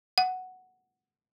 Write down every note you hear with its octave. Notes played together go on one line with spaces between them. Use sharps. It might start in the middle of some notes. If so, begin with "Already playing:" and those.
F#5